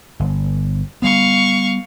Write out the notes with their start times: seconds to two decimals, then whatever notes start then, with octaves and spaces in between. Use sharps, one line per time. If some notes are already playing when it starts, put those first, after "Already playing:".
0.20 G1
1.02 G3 B3 F5 C#6